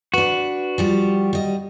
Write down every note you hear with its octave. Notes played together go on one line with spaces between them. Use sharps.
D4 F#4 B4
F3 G3 G4
G3 D#5